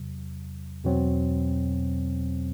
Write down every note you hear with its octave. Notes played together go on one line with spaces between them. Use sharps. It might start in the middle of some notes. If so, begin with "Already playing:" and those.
Already playing: E2 C3 F#3
E2 B2 F#3 C4